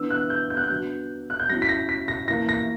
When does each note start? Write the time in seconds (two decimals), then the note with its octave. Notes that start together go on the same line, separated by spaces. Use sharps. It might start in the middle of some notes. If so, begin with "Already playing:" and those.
Already playing: E3 B3 D4 E6
0.10 F#6
0.30 G6
0.50 G6
0.57 F#6
0.64 G6
0.70 D3 F#3 B3 D4
1.30 F#6
1.39 G6
1.49 F#3 C#4 E4 A#6
1.62 B6
1.69 A#6
1.89 B6
2.08 A#6
2.28 E3 A#3 E4 A#6
2.49 A#6